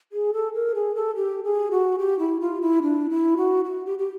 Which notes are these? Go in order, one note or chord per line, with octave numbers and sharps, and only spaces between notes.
G#4
A4
A#4
G#4
A4
G4
G#4
F#4
G4
E4
F4
E4
D4
E4
F#4
F#4
G4
G4